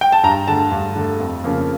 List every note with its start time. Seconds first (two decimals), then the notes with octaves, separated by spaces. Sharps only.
0.01 G5
0.12 A5
0.23 G2 A#5
0.48 D3 A3 A5
0.72 G2
0.95 D3 A3
1.20 F2
1.44 C#3 F3 A#3